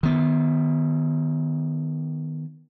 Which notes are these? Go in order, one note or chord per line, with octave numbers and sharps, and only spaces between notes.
D#3 B3